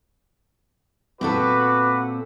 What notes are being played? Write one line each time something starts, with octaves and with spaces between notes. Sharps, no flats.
A#2 C4 F#4 A4 B4 D6